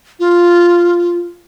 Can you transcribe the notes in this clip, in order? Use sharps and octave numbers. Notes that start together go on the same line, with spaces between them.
F4